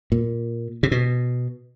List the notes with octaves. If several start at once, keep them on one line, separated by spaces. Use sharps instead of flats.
A#2
C3
B2